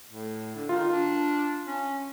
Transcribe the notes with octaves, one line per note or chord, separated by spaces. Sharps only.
A2
D3
D#3 F4
D4
C#4